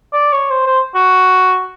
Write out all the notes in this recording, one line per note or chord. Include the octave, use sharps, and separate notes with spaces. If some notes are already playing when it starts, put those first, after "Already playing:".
D5
C#5
C5
C5
F#4